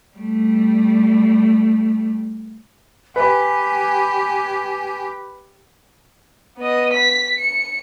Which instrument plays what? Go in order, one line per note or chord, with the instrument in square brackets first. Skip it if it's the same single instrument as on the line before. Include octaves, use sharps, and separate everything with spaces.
[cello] G3 A3
[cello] G4 [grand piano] B4 [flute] G#5
[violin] B3 D#5
B6
C#7